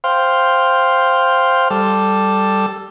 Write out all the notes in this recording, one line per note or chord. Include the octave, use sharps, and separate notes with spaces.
C5 F5 G5
G3 A4